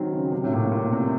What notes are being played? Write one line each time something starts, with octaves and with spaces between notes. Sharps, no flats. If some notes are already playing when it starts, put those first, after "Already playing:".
Already playing: D#3 F#3 C4
C#3
C3
A2
A#2
A#2
C3